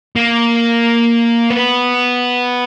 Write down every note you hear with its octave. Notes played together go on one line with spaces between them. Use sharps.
A#3
B3